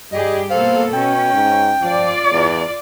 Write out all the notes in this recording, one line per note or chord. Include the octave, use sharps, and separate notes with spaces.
G2 G3 G4 G#4 D#5
B2 A#3 A4 C5 F5
B2 C#4 G5
G#2
F3 F4 D5
E2